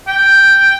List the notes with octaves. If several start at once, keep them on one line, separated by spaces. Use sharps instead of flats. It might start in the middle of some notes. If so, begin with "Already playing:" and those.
G5